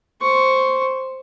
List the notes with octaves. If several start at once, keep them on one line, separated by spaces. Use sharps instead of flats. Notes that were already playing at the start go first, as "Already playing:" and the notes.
C5 C#6